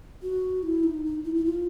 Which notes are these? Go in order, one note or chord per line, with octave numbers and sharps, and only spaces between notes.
F#4
E4
D#4
D#4
E4
E4
F4